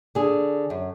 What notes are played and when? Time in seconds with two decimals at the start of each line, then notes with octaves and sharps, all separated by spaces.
0.15 D3 G#4
0.70 F#2